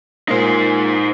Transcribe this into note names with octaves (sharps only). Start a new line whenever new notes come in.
A#2 G#3 A#3 D#4 C5